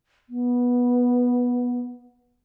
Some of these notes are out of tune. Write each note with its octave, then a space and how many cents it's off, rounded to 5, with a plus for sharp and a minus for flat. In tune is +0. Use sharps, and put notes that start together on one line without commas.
B3 -15